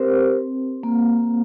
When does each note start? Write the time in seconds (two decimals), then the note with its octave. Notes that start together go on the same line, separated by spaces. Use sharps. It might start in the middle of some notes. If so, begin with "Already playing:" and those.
Already playing: C4 G4 A#4 C5
0.83 A#3